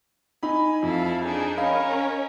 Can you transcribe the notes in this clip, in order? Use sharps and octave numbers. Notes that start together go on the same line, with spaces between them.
D#4 G#5 B5
F2 E4 A4 F5
D4 D#4 G#4
C#4 A#4 C#5 D#5 F5 B5